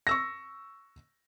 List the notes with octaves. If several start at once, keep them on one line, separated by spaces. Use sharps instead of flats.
C#6 E6 A#6